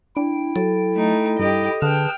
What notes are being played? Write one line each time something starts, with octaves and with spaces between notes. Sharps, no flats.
D4 E4 G5
F#3 A4
A3 D#4
G2 G4 D#5
D3 G#4 B4 G5 A5 F6